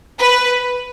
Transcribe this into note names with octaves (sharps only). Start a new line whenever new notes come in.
B4